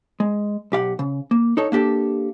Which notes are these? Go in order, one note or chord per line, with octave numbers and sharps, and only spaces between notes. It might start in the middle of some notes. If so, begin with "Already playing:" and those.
G#3
B1 G4 F5 F#5
C#3
A#3
D#4 A4 C#5
A#3 D4 G4 A4